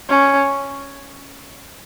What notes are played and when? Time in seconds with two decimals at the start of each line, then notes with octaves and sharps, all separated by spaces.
0.09 C#4